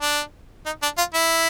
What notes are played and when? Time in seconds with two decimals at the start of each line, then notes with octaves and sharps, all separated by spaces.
0.01 D4
0.66 D#4
0.83 D4
0.98 F4
1.14 E4